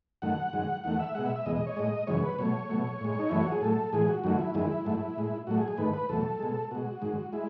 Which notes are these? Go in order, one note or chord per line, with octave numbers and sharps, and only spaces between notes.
F#2 D#3 A3 F#5
F#2 D#3 G#3
E2 D#3 A3 F#5
E5
B2 G#3 F#5
E5
E5
E2 B2 G#3 D#5
D#5
C#5
A2 G#3 D#5
F#2 C#3 E3 G#3 C#5
B4
B2 F#3 A3 C#5
B2 F#3 A3
A2 G#3
D#4
F#2 E3 A3 E4
F#4
G#4
A2 F#3 A3 A4
A2 E3 G#3 G#4
F#4
F#2 D#3 F#3 A3 F#4
E4
F#2 D#3 G#3 E4
G#2 F#3 A3
A2 G#3
A2 F#3 A3 F#4
G#4
G#4
G#2 D#3 A3 B4
B4
E2 B2 F#3 A3 A4
B2 G#3
B2 G#3 F#4
G#2 D#3 G#3
G#3 E4